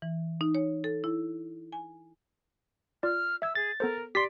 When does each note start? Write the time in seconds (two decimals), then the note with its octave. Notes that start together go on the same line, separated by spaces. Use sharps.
0.02 E3
0.41 D#4
0.55 C#5
0.84 A4
1.04 E4
1.72 G#5
3.03 F4 D5 F6
3.42 E5 E6 G#6
3.55 G#4 A6
3.80 B3 A4 A#4 C5
4.15 G4 D5 C6 A6 B6